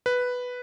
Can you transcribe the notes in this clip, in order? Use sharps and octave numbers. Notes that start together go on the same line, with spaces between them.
B4